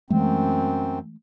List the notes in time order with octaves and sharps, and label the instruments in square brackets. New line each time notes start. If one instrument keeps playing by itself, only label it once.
[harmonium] F#2 C4 [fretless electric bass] E3 G#3 A3